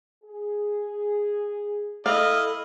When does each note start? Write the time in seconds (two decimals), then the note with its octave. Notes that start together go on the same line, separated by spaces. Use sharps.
0.24 G#4
2.06 E4 A4 D#5 F5